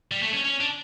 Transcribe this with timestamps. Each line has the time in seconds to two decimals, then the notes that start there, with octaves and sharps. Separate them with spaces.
0.12 G3
0.22 A3
0.33 C#4
0.44 C#4
0.60 D4